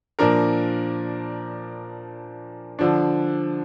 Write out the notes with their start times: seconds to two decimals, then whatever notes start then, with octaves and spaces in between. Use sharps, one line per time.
0.19 A#2 F3 D4 A#4
2.79 D3 F3 D4